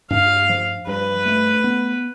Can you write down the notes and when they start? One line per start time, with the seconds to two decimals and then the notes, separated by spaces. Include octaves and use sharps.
0.10 G2 F5
0.49 F3
0.87 G2 B4
1.25 A3
1.64 B3